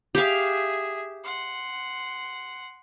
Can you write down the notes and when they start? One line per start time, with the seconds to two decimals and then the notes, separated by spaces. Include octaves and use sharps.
0.15 G4 G#4 E5 F5
1.23 F#5 C6